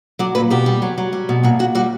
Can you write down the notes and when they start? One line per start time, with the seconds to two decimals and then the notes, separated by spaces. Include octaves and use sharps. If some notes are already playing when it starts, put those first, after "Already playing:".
0.19 F#3 D5
0.35 A#2 B4
0.50 B2 G4
0.66 G3
0.82 F#3
0.98 F#3
1.13 G3
1.29 B2
1.43 A#2 F#4
1.59 A#2 F#4
1.75 G3 F#4